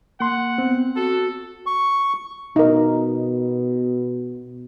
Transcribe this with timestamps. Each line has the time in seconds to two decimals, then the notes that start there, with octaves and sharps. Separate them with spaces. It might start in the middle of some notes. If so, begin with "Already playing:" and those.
0.20 A#3 F#5 C6
0.58 B3 C4
0.96 F#4 A4
1.66 C#6
2.56 B2 D#4 A#4